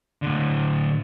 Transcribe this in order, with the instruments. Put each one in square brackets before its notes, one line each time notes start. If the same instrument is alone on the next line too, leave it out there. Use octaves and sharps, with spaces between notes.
[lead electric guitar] A2 D3